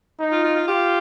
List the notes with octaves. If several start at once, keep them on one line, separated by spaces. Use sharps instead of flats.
D#4
F4
F4
F4
F4 G4